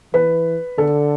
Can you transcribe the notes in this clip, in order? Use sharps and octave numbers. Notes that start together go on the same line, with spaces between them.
E3 B4
D3 A4